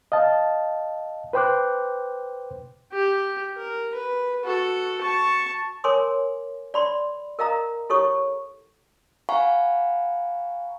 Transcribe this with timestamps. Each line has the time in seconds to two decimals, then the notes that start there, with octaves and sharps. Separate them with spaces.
0.12 D#5 F5 A5
1.33 B4 C5 G5 C6 D6 F#6
2.92 G4
3.57 A#4
3.95 B4
4.45 F#4 A4
5.02 A5 C#6
5.84 A#4 C#5 G#5 C6 D6 D#6
6.74 D5 B5 C6
7.39 A#4 D#5 F5 A#5 D#6
7.90 E4 G4 A4 C#5 C#6 D#6
9.29 F5 F#5 G#5 A#5 B5 C#6